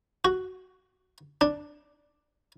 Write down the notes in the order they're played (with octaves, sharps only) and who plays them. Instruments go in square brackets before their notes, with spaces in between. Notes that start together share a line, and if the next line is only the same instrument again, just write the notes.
[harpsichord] F#4
D4